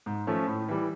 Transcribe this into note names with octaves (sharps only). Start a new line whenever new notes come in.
G#2
F3 A3 C#4
A2
E3 G3